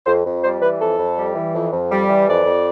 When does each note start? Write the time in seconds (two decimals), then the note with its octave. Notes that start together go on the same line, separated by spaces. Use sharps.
0.06 F2 C5
0.26 F2
0.43 G3 C5
0.62 E3 B4
0.81 F2 A4
0.98 F2
1.17 G3
1.35 E3
1.54 F2
1.72 F2
1.91 G3
2.09 E3
2.27 F2 D5
2.45 F2